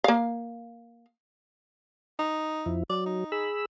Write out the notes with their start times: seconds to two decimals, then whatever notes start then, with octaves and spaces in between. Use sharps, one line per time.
0.04 A#3 F5
2.19 D#4
2.66 F2 F3 E4
2.90 F#3 D5
3.06 D#4
3.32 G#4 B5 E6